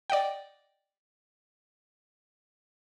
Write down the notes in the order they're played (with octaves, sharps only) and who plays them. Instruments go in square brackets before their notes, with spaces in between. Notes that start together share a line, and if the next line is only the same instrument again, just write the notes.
[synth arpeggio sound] D5 D#5 F#5 G5